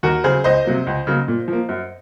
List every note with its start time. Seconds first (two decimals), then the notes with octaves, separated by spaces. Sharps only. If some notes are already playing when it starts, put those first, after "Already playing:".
0.03 D#2 F#4 A#4
0.24 C#3 F#3 G#4 C5
0.44 C#2 C5 D#5
0.65 C3 F#3 A#3
0.87 C#2
1.07 C#3 F#3 A#3
1.28 A#2
1.48 F3 A#3
1.69 F#2